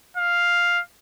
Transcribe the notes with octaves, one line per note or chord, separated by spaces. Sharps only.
F5